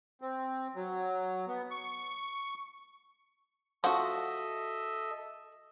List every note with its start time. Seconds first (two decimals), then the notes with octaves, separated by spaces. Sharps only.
0.21 C4
0.75 F#3
1.47 B3
1.71 C#6
3.84 F3 F#4 A4 D#5 E5 F#5